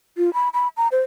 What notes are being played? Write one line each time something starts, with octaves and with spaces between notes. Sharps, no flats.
F4
B5
B5
A#5
C5